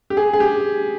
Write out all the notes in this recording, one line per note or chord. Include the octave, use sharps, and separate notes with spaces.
G4
G#4
G#4
G4